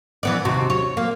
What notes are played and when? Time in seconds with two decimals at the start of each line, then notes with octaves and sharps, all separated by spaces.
0.23 E3 B3 D5
0.45 D#2 C3 F#4
0.70 C#5
0.97 A#3